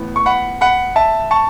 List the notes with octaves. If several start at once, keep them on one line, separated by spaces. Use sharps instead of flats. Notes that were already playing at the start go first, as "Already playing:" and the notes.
Already playing: A2 E3 B3
C#6
F#5 B5
F#5 B5
E5 A5
A5 C#6